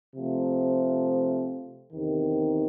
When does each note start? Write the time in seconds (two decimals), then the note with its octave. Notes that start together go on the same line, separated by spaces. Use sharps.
0.16 C3 F3 A3
1.93 E2 C3 D#3